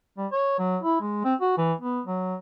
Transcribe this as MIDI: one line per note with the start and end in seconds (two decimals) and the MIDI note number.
0.18 0.27 55
0.32 0.54 73
0.58 0.78 54
0.83 0.97 64
1.01 1.23 56
1.24 1.34 60
1.41 1.53 66
1.57 1.73 52
1.81 2.01 59
2.06 2.35 54